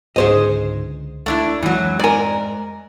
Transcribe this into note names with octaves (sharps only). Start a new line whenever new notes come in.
C#2 G#2 D3 G#4 C5 D#5
C#2 A3 D4 E4
F2 E3 F#3 G#3
G#2 A#4 D5 G#5